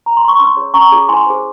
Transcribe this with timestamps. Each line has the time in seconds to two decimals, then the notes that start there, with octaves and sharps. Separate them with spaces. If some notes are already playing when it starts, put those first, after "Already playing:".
0.06 A#5
0.17 C6
0.28 C#6
0.39 C#4 C6 E6
0.57 F4 G#4 C#5
0.74 C#4 A#5 C#6
0.91 F4 G#4 C#5
1.09 E4 G#5 C6
1.26 G#4 C5